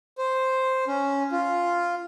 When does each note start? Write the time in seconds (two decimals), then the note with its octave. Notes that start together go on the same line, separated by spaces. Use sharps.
0.18 C5
0.87 C#4
1.32 F4